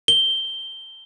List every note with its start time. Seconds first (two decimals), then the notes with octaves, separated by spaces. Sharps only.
0.08 G7